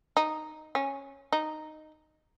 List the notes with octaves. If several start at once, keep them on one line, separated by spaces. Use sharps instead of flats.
D#4
C#4
D#4